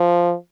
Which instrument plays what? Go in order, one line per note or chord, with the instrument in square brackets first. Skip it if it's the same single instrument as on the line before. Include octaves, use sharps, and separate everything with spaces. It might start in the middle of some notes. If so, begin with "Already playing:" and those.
Already playing: [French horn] F3